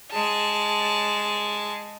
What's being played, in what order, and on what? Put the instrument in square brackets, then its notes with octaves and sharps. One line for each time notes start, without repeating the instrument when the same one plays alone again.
[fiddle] G#3 A5